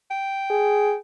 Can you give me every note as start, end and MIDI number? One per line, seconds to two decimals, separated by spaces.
0.11 0.95 79
0.50 0.96 68